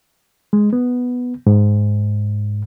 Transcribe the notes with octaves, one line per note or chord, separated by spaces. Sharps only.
G#3
B3
G#2